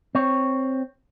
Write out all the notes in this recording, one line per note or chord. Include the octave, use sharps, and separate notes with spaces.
C4 C#5